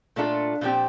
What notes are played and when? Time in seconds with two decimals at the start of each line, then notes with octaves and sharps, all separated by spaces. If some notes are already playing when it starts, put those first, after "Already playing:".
0.16 A#2 A3 D4 F4 A4
0.61 A#2 F3 C4 G4